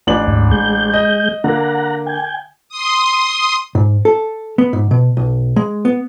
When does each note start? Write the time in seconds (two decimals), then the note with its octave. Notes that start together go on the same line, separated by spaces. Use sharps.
0.07 A1 D4 F#7
0.27 D2 G#2
0.51 G#3 G6
0.93 D#5
1.44 D3 A#3 F#5 A#5
2.06 G5 G#5
2.69 C6 D#6
3.75 G#2
4.05 A4
4.58 B3
4.73 G#2
4.91 B2
5.17 B1
5.56 G#3
5.85 B3